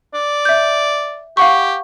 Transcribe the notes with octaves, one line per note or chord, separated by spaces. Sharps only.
D5
E5 G6
G4 F5 F#5 C#6